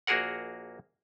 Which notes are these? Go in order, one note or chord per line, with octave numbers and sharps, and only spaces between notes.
A#1 A#3 F#4 G#4 A#4 F#5